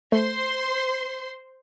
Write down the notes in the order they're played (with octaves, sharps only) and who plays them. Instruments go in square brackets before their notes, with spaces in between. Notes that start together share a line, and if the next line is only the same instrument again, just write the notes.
[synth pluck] A3 [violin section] C5 C6